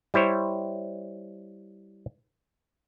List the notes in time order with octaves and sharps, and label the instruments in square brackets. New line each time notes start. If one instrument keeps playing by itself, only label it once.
[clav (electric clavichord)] G3 E4 C5 C#5